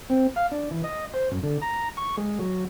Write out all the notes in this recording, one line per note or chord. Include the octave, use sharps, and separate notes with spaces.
C4
F5
D4
E3
D#5
C5
F#2
D3
A#5
C#6
G#3
F#3